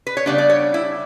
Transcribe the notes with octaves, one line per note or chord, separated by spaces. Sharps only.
B4
C#5
C#3 G3 B3 D4 D5
D5
C#5
E4